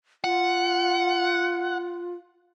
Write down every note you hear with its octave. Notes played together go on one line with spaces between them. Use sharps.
F4 F#5